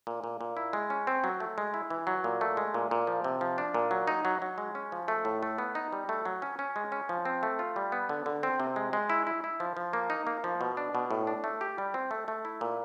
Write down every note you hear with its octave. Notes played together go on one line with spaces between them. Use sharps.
A#2
A#2
A#2
E4
G#3
C#4
C4
F#3
A3
G#3
E4
E3
F#3
A#2
A3
G#3
A#2
A#2
F3
C3
F3
D4
A#2
F#3
D#4
F#3
F#3
G#3
C#4
F3
A3
A2
A3
B3
D#4
G3
A3
F#3
C#4
C#4
G#3
C#4
F3
C4
A3
F4
G3
B3
D3
D3
C4
C3
G#3
G#3
E4
E4
E4
F3
F3
A#3
D#4
A#3
F3
B2
D4
B2
A2
D4
A3
G4
G3
C4
A3
A3
E4
A#2